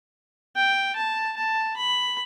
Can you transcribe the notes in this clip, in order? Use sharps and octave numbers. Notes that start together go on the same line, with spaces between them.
G5
A5
A5
B5